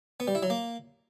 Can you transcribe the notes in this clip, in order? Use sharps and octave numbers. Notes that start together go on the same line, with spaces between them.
B3
G3
E4
F#3
A#3